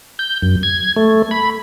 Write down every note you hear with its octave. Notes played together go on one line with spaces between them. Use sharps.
G6
F#2
G#6
A3
B5